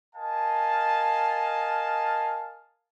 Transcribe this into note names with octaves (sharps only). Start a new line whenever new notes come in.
A#4 D#5 F5 G#5 A5